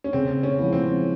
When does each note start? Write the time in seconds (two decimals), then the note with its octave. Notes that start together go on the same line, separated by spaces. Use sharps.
0.04 C#4
0.13 C#3 C4
0.43 C#4
0.58 F3 G#3 B3 E4
0.73 C4